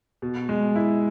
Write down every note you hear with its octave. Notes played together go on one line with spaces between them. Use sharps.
B2
G#3
E4